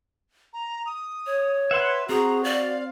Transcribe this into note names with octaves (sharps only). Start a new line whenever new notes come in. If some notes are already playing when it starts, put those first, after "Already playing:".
A#5
D#6
C#5
B4 E5 F#5 C6
C4 F#4 G#4 A#5
D5 F5